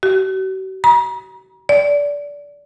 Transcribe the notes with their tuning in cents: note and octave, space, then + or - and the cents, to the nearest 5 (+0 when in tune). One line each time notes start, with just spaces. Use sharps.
F#4 +45
A#5 +40
D5 -20